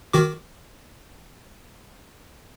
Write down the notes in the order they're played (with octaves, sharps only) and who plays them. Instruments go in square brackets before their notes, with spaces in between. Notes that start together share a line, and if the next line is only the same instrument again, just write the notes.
[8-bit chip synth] D#3 F#4 D6